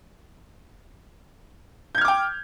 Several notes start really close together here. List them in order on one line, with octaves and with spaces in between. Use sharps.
G6 G#6 F6 D6 G5